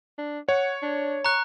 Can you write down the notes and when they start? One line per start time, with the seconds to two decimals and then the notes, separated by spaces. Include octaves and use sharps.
0.18 D4
0.49 C#5 F#5
0.83 D4
1.25 A#5 C#6 F#6